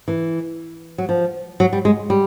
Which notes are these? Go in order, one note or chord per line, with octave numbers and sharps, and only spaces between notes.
E3
F#3
F3
F#3
G3
G#3
G3